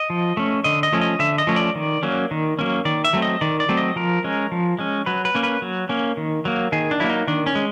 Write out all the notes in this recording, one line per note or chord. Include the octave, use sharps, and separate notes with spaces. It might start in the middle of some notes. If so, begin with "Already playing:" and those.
Already playing: D#5
F3
A3 C#4
D3 D#5
D#5
F3 A3 C#4
D#5
D3 E5
D#5
F3 A3 C#4
D5
D#3
F#3 A#3 C#4
D#3
F#3 A#3 C#4
D#3 D5
E5
F#3 A3 C4
D#5
D#3 D5
D5
F#3 A3 C4
D#5
F3 A#4
G#3 C#4
F3
G#3 C#4
F#3 B4
B4
A#3 C#4
B4
F#3
A#3 C#4
D#3
F#3 A#3
D#3 G#4
D4
F#3 A#3 E4
D#4
D#3 D4
C#4
G#3